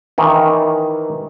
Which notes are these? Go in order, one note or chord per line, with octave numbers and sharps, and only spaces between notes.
D#3 E3